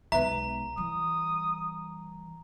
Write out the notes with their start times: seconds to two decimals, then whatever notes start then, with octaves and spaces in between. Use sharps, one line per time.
0.12 B1 G#3 B4 E5 A#5
0.77 E3 G3 D#6